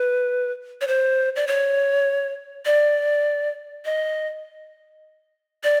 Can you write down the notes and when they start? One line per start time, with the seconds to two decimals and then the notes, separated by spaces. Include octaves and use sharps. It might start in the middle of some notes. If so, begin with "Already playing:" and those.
Already playing: B4
0.81 C#5
0.88 C5
1.36 D5
1.47 C#5
2.66 D5
3.85 D#5
5.64 D5